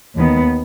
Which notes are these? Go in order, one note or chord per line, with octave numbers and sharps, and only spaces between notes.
D#2 D#3 B3